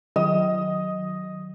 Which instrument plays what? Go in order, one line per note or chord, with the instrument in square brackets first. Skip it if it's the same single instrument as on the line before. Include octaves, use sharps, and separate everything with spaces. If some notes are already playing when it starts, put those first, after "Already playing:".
[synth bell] D#3 F#3 D#6 [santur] D#5